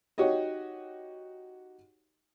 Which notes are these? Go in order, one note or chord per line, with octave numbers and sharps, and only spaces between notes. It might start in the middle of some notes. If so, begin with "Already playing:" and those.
D#4 F#4 G4 C#5 D#5